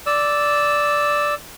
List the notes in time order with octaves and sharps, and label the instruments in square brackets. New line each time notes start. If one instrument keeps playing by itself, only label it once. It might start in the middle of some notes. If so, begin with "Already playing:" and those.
[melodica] D5 E6